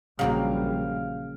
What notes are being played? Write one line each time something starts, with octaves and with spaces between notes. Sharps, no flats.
A#1 C#3 F#3 G3 A#3 F5 G5